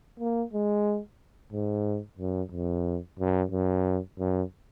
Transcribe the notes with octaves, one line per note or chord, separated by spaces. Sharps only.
A#3
G#3
G#2
F#2
F2
F#2
F#2
F#2